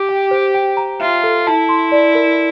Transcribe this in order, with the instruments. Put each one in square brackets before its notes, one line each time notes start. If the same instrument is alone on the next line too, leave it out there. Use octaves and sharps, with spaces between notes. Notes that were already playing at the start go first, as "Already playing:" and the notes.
Already playing: [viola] G4 [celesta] D6
[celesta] G5
C5
G5
A#5
[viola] F4 [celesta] E5
[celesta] A4
[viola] E4 [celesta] A5
[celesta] C6
D5
A#4